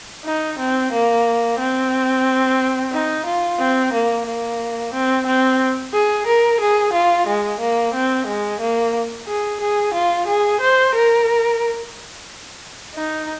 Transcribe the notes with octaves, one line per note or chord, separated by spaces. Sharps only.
D#4
C4
A#3
C4
D#4
F4
C4
A#3
A#3
C4
C4
G#4
A#4
G#4
F4
G#3
A#3
C4
G#3
A#3
G#4
G#4
F4
G#4
C5
A#4
D#4